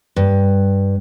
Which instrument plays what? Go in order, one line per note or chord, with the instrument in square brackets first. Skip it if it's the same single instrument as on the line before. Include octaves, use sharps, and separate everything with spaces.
[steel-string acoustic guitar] G2